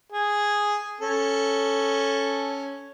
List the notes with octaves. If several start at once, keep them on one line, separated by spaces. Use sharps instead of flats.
G#4
C#4 A4